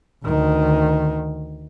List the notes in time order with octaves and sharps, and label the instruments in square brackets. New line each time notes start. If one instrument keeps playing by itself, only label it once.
[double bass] D2 D#3